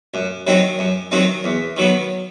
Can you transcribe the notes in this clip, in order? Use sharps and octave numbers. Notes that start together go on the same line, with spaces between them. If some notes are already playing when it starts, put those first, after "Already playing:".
F#2
D#3 F#3 C4 D#4
F#2
D#3 F#3 C4 D#4
E2
D#3 F#3 B3